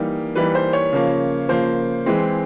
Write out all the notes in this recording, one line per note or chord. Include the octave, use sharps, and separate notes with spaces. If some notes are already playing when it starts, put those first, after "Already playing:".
Already playing: E3 G3 A#3 D#4
E3 G3 A#3 D#4 B4
C5
C#5
C#3 F3 A#3
C#3 F3 A#3 C5
E3 G#3 C4